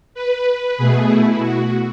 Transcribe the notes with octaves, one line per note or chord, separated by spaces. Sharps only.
B4
B2 A3 G#4
E4
F#4